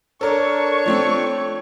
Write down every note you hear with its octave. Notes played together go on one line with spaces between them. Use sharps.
D4 A4 A#4 C#5 C#6
F3 A3 C4